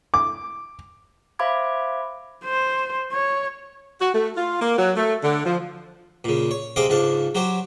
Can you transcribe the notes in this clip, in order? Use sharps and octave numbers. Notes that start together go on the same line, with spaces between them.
D6
C5 E5 F5 B5 D6 G#6
C5
C#5
F#4
A3
F4
A#3
F#3
A3
D3
F3
A#2 C#3
C#5
C3 C4 G#4 D#5 F5 D6
C#2 G#2 D4 F5
F#3 G4 C5 C#5